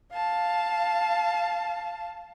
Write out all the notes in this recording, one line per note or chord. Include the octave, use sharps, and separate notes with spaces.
F5 A5